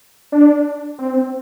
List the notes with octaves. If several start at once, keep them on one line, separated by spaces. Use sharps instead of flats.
D4
C4